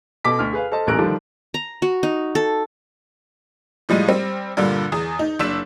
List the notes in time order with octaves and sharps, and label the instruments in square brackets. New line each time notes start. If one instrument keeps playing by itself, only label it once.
[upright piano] B2 A4 D6 B6
D2 F6
G#4 B4 F5
A4 C5 D#5 A5
D#1 A1 E2 A#4 F#6 D7
D3 D#3 F3 G3 D4
[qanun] A#5
F#4
D#4
A4
[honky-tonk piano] A2 F3 G3 G#3 D#7
G3 C4
G2 A#2 D3 G3
E2 G#4 D#6
D#4
F#1 D4 E6 B6 E7